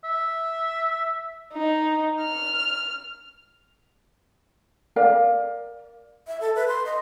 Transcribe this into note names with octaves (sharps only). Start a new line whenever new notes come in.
E5
D#4
F6
A#4 D5 F5
E5
A4
B4
C6
D#5